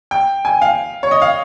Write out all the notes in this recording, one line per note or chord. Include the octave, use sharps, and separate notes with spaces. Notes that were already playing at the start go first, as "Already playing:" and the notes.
G5
G#5
F5
C#5
D#5
F5